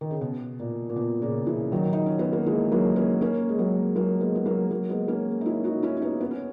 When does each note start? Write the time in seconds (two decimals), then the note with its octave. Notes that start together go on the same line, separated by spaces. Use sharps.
0.01 D#3
0.11 C#3
0.21 B2
0.60 A#2
0.90 A#2
0.96 B2
1.22 A#2 C#3
1.46 C#3 E3
1.72 D#3 F#3
1.93 D#4
2.06 C#4
2.19 B3
2.33 A#3
2.46 E3 G#3
2.72 F#3 A#3
2.96 A#3 C#4
3.21 A#3 C#4
3.49 G#3
3.59 F#3 A#3
3.96 F#3 A#3
4.20 G#3 B3
4.35 B3
4.46 F#3 A#3
4.70 F#3 A#3
4.89 G#3 B3
5.08 A#3 C#4
5.41 D#4
5.45 C#4 E4
5.64 D#4 F#4
5.83 C#4 E4
5.97 C#4
6.02 B3 D#4
6.21 B3
6.31 C#4